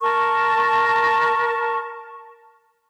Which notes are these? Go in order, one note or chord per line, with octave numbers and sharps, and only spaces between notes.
A#4 A5 C#6